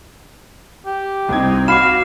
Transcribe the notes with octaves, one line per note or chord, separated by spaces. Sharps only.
G4
C2 C4 D#4 G#6
F#4 F5 B5 D6 C7 E7